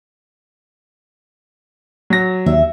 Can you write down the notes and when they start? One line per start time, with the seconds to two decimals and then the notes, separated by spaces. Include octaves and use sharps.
2.10 F#3 A#6
2.46 D#2 E5